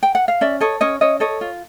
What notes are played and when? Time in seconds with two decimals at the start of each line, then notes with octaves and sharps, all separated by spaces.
0.03 G5
0.15 F#5
0.28 F5
0.41 C#4 D5 E5
0.60 A4 C#5 D#5
0.81 C#4 C#5 D#5
1.01 C#4 C#5 D#5
1.20 A4 C#5 D#5
1.41 F4